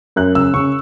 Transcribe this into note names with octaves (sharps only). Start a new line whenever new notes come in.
F#2 F#6
C#3 E6
C#3 C#6